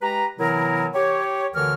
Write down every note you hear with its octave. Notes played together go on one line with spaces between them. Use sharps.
G#3 G4 B4 A#5
C3 E3 F#3 B3 E4 A#4
G4 C#5
D2 D3 E3 A#4 C#5 F6